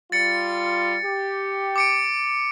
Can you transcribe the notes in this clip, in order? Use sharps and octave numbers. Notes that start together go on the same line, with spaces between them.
G3 F4 A6 C#7
G4
D6 C#7 D7